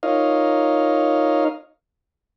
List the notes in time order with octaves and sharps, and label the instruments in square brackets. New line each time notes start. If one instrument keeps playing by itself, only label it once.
[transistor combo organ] D#4 F4 A#4 C#5 D#5 F5